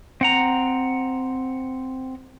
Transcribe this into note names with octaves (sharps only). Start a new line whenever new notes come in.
C4 F#5 A#5